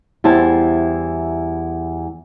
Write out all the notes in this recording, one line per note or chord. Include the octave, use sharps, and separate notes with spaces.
E2 G3 E4 C5 A5